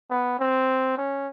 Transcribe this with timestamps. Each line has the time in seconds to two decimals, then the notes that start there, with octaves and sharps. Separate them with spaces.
0.11 B3
0.39 C4
0.97 C#4